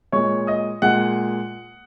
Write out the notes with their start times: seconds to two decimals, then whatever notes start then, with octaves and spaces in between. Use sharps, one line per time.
0.12 A#2 G#3 C#5 C#6
0.47 D#5 D#6
0.82 A#2 G#3 F#5 F#6